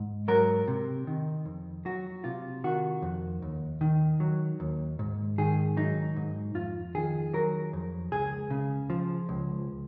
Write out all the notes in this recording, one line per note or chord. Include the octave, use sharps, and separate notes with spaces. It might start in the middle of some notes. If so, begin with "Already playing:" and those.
Already playing: G#2
F#3 A#4
C3
D#3
F2
F#3 F#4
C3 F4
D#3 F#4
F2
D#2
D#3
F#3
D#2
G#2
D#3 G#4
F#3 D#4
G#2
F2 F4
D#3 G#4
F#3 A#4
F2
C#2 G#4
C#3
F3
C#2